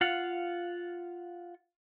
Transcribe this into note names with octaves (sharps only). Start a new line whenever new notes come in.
F4 F5 F#5